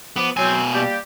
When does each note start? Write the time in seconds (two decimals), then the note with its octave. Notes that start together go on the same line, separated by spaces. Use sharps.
0.16 F3 B3 D6
0.37 B2 F#3 C4 G#5
0.73 G3 A#3 G4